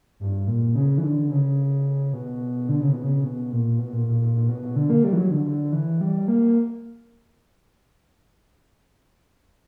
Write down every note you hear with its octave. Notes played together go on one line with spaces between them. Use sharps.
G2
A#2
C#3
E3
D3
C#3
B2
D3
C#3
B2
C#3
B2
A#2
B2
A#2
A#2
A#2
A#2
B2
B2
D3
A#3
G3
E3
F#3
D3
D3
E3
G3
A#3